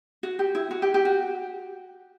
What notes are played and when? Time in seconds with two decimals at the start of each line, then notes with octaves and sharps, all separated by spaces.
0.23 F#4
0.39 G4
0.55 E4
0.71 F#4
0.82 G4
0.94 G4
1.05 F#4